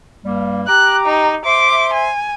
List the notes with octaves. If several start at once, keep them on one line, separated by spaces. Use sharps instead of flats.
G2 G3 A#3
G4 A#5 D6 F#6
D#4
C5 E5 C6 D6
G#5